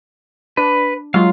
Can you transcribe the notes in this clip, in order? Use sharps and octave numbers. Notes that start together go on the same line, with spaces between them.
D4 B4
F#3 G#3 F4 F5